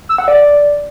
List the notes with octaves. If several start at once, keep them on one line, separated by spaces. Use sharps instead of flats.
E6
F#5
D5